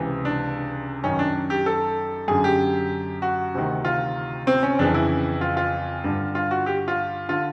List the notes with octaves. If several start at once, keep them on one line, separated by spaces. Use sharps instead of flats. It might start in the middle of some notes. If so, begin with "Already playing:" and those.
Already playing: C#2 C3 E3
D4
F#2 D#3 C#4
D4
G4
A4
F#2 D3 G#4
G4
F#4
D2 C3 D#3
F4
C4
C#4
F2 C#3 E3 D4
E4
F4
F4
G2 D3
F4
F#4
G4
F4
D3 F4